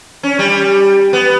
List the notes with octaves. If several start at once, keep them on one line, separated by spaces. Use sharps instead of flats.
C#4
G3
B3